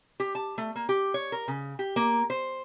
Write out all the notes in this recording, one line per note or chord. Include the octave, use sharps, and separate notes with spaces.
G4
A5
A3
A#3
G4
C#5
A#4
C#3
G4
A#3
C5